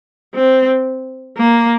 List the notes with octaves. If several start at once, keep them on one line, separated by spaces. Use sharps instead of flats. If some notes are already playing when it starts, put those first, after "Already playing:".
C4
A#3